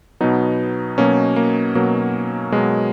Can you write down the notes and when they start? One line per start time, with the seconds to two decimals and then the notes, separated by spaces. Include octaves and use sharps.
0.20 B2 F#3 B3 D#4
0.98 B2 F#3 A#3 C#4
1.36 A#3
1.75 B2 F#3 A#3
2.52 B2 F#3 G#3